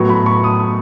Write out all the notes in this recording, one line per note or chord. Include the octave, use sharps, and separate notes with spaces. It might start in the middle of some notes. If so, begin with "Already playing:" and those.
Already playing: A2 F#3 B3 C#6
B5
C#6
D#6